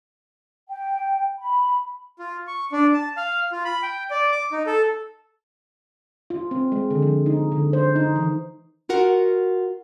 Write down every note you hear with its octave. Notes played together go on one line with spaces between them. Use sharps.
G5
B5
F4
C#6
D4
A5
F5
F4
B5
G5
D5
D6
D#4
A4
F4
C4
G#3
D3
F3
D#4
D3
C5
D#4
E3
F4 F#4 A#4 F#5